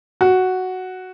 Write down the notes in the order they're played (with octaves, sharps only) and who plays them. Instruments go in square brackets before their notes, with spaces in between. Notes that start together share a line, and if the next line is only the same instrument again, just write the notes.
[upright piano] F#4